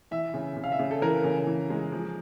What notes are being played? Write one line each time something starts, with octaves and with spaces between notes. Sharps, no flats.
E3 E5
C#3
C#3
F5
E5
C#3
A4
E3 A#4
C#3
E3
G#3
F3